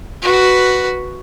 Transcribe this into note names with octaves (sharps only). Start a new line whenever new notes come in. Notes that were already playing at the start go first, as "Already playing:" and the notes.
F#4 B4